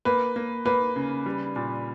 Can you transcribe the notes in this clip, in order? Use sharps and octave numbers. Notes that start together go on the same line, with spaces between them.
A#3 B4
A#3
A#3 B4
C#3
G3
A#2